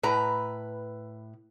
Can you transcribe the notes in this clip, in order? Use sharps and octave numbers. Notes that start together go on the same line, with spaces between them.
A2 B4 A#5